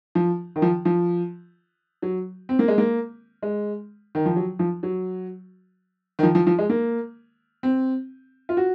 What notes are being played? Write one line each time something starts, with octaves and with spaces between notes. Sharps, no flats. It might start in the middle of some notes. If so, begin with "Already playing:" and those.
F3
D#3
F3
F3
F#3
C4
A#3
G#3
A#3
G#3
D#3
F3
F#3
F3
F#3
D#3
F3
F3
F3
G#3
A#3
C4
F4
F#4